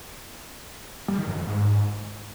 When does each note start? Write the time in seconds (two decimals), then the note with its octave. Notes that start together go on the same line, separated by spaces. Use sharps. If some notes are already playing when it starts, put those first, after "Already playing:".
1.08 G3
1.18 D#3
1.27 F#2
1.37 F2
1.46 G#2